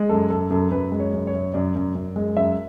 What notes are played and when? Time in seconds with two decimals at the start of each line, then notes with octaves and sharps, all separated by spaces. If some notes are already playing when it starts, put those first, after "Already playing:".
Already playing: G#3
0.09 F#2 A4
0.30 F#2 A4
0.51 F#2 A4
0.71 F#2 B4
0.92 G#3
1.00 C#5
1.14 F#2
1.27 C#5
1.34 F#2
1.54 F#2 D5
1.75 F#2
1.95 F#2
2.16 G#3
2.37 F#2 E5